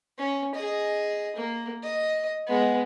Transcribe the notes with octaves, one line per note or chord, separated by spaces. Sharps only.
C#4
G#4 D#5
A#3
D#5
G#3 B3